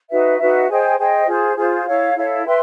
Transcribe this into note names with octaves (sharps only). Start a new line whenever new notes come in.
D#4 F#4 B4 E5
D#4 F#4 B4 E5
G#4 C5 D#5 G5
G#4 C5 D#5 G5
F4 G#4 C5
F4 G#4 C5
E4 A4 C#5 F5
E4 A4 C#5 F5
B4 E5 G5 C6